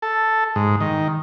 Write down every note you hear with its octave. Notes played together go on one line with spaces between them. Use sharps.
A4
G#2
D#3